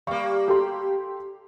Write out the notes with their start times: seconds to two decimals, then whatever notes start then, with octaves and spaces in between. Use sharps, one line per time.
0.07 G3 A#3 F5 C#6
0.48 G4 A4 C6